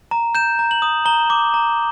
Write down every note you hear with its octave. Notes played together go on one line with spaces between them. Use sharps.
A#5
G6 E7
A#5
F#7
D#6
A#5 G7
D6
A#5